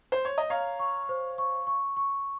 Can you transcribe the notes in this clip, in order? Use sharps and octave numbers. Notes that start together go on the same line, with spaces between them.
C5
C#5
D#5
C#5 F5 A#5
C#6
C5
C#6
C#6
C#6